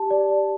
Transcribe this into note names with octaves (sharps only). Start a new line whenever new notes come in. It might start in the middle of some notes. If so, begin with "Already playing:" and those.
Already playing: G4 A5
D5